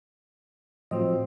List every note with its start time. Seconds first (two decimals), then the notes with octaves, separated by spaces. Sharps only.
0.91 A2 F3 F#3 C4 D#5